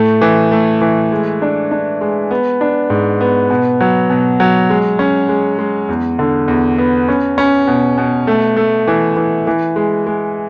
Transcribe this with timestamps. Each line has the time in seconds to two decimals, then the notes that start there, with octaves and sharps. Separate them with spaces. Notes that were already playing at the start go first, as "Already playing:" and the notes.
Already playing: A2 A3
0.21 E3
0.52 A3
0.81 E3
1.12 G#3
1.42 D4
1.71 D4
2.01 G#3
2.31 B3
2.61 D4
2.90 G#2
3.21 B3
3.50 B2
3.81 F#3
4.10 B2
4.40 F#3
4.70 G#3
4.99 C#4
5.29 G#3
5.59 G#3
5.89 E2
6.19 D3
6.48 E2
6.78 B3
7.08 C#4
7.38 C#4
7.67 B2
7.98 B2
8.27 A3
8.57 A3
8.87 E3
9.17 E3
9.47 E3
9.76 G#3
10.07 G#3